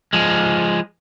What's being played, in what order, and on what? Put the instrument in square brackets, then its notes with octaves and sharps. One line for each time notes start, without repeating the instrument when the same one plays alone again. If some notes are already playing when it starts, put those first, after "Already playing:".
[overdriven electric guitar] F3 G#3